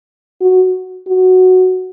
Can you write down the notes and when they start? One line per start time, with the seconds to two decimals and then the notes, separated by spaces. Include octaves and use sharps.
0.41 F#4
1.07 F#4